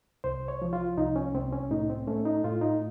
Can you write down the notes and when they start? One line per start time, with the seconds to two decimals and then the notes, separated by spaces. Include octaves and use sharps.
0.24 C2 C5
0.48 C#5
0.62 F3
0.73 F4
0.98 C2 D#4
1.16 C#4
1.35 C2 C4
1.53 C#4
1.71 A2 D#4
1.90 C4
2.07 A3 C#4
2.25 D#4
2.44 A2 F4
2.62 D#4